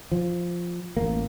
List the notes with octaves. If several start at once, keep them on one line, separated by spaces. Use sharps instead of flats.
F3
A1 A#3